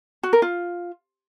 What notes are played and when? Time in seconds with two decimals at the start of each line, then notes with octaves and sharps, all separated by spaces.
0.23 F#4
0.33 A#4
0.42 F4